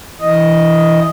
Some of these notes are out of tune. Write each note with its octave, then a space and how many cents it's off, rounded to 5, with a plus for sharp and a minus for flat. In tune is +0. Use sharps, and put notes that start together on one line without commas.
E3 +0 D#5 +0